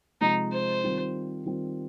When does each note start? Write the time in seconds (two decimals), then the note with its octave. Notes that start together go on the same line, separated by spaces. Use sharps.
0.21 C3 F3 G#3 D#4
0.52 C5
0.84 D#3 G3 C4 F4
1.46 D#3 G3 C4 F4